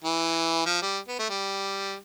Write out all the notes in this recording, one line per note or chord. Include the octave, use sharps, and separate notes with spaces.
E3
F3
G3
B3
A3
G3